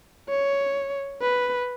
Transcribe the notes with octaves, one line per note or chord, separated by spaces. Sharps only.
C#5
B4